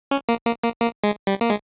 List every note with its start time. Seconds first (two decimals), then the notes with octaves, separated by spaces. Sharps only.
0.11 C#4
0.29 A#3
0.46 A#3
0.64 A#3
0.80 A#3
1.04 G#3
1.27 G3
1.41 A#3
1.50 G#3